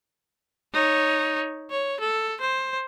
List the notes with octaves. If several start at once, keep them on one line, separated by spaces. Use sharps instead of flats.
D#4 C#5
C#5
A4
C5